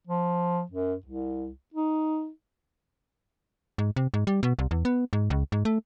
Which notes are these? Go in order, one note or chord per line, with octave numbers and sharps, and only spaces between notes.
F3
F#2
C2
D#4
G#2
C3
G#2
G3
B2
C2
E2
B3
G#2
C#2
G#2
A3